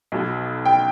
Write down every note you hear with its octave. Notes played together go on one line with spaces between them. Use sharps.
B1 B2
G5